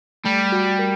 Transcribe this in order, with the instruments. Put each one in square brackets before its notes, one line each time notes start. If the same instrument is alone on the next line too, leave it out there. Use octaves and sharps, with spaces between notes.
[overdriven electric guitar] G3 [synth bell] A3
[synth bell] F#4
A#4